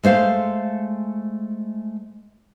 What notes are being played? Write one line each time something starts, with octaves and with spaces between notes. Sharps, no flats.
G#3 A3 C5 F5